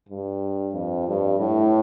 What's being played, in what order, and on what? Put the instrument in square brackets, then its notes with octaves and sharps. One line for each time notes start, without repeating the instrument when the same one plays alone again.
[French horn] G2
F2
G2
A2